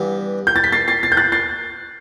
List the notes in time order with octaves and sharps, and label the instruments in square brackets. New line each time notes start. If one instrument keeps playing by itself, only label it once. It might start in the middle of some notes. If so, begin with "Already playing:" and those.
Already playing: [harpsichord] G2 E3 B3
[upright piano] G6
A6
B6
A6 C7
A6 C7
A6 C7
G6
F#6 A6
A6 C7